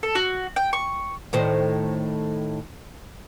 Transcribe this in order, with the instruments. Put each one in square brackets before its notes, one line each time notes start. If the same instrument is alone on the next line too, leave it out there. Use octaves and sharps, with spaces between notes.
[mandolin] A4
F#4
G5
C#6
[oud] A2 D#3 C5